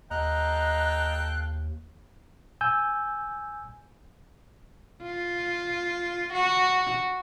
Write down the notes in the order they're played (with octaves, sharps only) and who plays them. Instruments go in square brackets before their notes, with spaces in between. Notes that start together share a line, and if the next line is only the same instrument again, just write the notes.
[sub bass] D#2 [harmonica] A4 F5 G5 [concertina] D#5 A#5 [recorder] F#6
[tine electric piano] G#5 E6 G6
[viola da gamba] F4
F#4